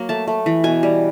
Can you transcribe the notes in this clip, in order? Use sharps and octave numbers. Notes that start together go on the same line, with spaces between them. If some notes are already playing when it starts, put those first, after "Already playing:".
Already playing: F#3 A#3
A3 A5
A3
E3
B2 G#5
G3